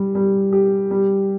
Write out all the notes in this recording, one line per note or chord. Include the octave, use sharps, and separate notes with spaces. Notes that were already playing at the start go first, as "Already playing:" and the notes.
Already playing: G3
G3
G4
G3